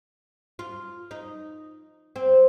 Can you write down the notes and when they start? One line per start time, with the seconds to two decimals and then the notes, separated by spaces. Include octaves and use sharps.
0.59 F4
1.11 D#4
2.16 C4